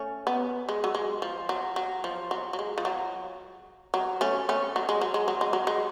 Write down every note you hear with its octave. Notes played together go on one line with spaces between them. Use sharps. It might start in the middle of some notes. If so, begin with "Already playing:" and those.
Already playing: A3 C#4
B3
G#3
F#3
G#3
F3
F#3
F#3
F3
F#3
F#3
G#3
F3
F#3
F#3
A3 C#4
A3 C#4
F#3
G#3
F#3
G#3
F#3
G#3
F#3
G#3